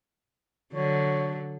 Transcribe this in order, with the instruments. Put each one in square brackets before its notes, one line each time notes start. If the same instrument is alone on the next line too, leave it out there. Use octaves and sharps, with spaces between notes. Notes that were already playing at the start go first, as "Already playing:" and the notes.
[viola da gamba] D3 F#3 [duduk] C#5